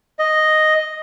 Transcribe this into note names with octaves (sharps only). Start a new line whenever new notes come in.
D#5